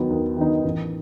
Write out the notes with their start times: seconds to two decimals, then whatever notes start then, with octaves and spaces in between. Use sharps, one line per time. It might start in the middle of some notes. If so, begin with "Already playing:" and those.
Already playing: D#2 D#3 F#3 B3 D#4
0.10 D#2
0.37 D#3 F#3 B3 D#4
0.65 A1